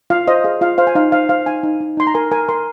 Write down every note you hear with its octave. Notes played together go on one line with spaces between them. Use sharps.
F4 F5
C5 D#5
G#4 F5
F4 F5
C5 F5
G#5
D#4 F5
C5 F5
C5 F5
D#4 G#5
D#4
D#4
D#4 C6
A#5
A#4 G#5
A#4 G#5
A#4 C6